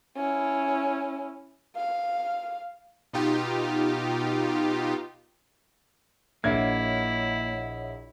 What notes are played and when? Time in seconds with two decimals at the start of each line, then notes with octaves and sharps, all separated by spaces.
0.17 C#4 E4
1.76 F5
3.13 B2 D#4 F4 G4
6.44 A#1 A#3 E4 C#5 D#5 E5 F#5 G#6